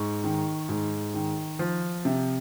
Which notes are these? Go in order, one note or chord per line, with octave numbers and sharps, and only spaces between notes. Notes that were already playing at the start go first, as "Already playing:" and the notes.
Already playing: G#2 C#6
D#3
G#2
D#3
F3
C3